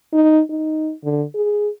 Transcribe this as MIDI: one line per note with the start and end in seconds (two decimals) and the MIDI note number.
0.13 0.41 63
0.49 0.92 63
1.04 1.24 50
1.35 1.69 68